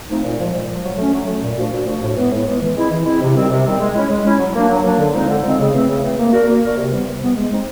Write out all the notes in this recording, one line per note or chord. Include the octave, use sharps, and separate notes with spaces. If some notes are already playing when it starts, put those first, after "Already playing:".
F3 A3 C4 D#4
A#2
F3 G#3
A#2
F3
G#3
F#3
A3 C#4
F#3
A3 C#4
A#2
F3 A3 D4 F#4
A#2
F3 A3 D4 F#4
A2
E3 G#3 B3
A2
E3 G#3 B3
E3
G#3 C4 E4
E3
G#3 C4 E4
C3
D#3 G3 C4
C3
D#3 G3 C4
G#3
C#4 E4
G#3
C#4 E4
F#3
A#3 D4
F#3
A#3 D4
D3
F3 G#3 C4 D#4
D3
F3 G#3 C4 D#4
C#3
E3 A3 C4
C#3
E3 A3 C4
A#3
D4 F#4 A#4
A#3
D4 F#4 A#4
C3
E3 G3 B3
C3
E3 G3 B3
G#3
C4 D#4